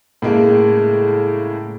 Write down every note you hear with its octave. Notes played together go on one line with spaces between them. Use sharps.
A2 C#3 G#3 A#3